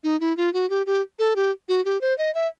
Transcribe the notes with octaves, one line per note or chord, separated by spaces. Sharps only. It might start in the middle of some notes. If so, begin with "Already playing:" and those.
D#4
E4
F4
F#4
G4
G4
A4
G4
F#4
G4
C5
D#5
E5